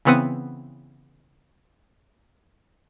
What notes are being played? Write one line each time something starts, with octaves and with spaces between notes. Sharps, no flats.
C#3 E3 B3 C4 F#5 D#7